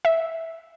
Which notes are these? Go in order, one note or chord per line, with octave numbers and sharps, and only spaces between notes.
E5